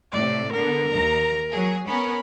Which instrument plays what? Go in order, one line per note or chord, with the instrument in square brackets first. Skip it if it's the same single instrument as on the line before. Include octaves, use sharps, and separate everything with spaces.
[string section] A2 C3 [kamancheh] D5
[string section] D3 B3 [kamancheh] A#4
[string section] D#2 A#5
F#3 G#4
[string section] B3 C#4 A#4 [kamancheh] B5